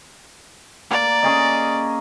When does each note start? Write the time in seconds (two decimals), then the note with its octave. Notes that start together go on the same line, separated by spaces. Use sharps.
0.90 A#3 D5
1.23 C#4 G#4 D#5